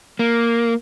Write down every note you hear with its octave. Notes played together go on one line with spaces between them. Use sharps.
A#3